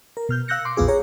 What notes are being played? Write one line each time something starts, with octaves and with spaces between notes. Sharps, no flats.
A#4
B2 F6 G6
F5 E6 F#6 G6 A#6 C#7
C6 D6
A#1 E2 B3 F4 G#4 D6
G#4 C#5 A#5